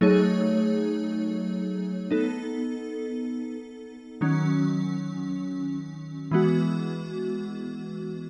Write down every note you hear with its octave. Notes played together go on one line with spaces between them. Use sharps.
F#3 A3 D#4 G#4 C#5
B3 D#4 A4
D#3 F#3 C#4
E3 G#3 B3 F#4